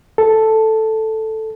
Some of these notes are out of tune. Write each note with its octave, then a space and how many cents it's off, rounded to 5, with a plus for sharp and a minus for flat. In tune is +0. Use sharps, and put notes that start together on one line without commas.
A4 +0